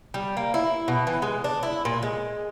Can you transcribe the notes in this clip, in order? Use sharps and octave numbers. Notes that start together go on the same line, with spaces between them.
G3
A#3
E4
B2
E3
G#3
D4
E4
A#2
G#3